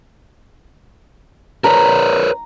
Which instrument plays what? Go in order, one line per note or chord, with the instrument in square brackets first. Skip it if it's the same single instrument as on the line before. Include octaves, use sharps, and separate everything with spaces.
[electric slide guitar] A#4 B4 C#5 [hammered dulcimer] A#5